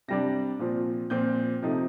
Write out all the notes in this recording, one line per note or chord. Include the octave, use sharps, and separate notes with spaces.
C3 G3 D4 A#6
A#2 F3 C4
A#2 F3 C4 G6
C3 F3 A3 D#4